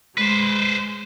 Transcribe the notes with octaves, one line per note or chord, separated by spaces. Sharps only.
G#3 B4 C5